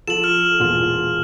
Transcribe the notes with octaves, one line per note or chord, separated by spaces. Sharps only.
F3 A4 E7 F#7
F6
E1 A#2 F4